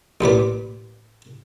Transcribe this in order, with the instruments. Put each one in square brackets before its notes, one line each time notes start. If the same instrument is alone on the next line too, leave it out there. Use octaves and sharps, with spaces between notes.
[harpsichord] A1 A#2 B3 D6